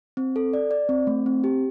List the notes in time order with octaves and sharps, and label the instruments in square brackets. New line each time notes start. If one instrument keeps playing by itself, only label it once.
[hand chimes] C4
A4
D5
D5
C4
A3
C4
G4